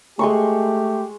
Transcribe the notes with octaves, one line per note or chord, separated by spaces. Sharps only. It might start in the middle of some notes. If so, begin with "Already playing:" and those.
G#3 A3 G4 C6 C#6